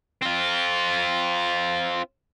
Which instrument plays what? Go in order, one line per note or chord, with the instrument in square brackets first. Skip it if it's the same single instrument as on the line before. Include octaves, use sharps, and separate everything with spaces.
[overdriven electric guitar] C4 F4